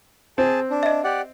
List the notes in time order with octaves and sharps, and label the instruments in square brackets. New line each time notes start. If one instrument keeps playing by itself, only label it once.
[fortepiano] C4 [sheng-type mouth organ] G#4 A5
[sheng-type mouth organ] D4
[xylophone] D#5 E5
[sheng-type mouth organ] G4 D5 F#5